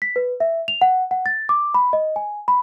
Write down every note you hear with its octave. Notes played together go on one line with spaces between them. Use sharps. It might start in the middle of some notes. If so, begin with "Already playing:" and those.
B6
B4
E5
F7
F#5
F#5
A6
D6
B5
D#5
G#5
B5